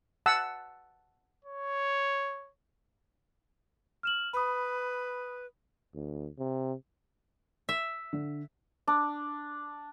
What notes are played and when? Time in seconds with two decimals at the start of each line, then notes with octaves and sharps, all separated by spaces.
0.26 F#5 A5 E6
1.45 C#5
4.03 F6 E7 F#7
4.33 B4 B5 D#6
5.94 D2
6.38 C3
7.69 E5
8.13 D3
8.87 D4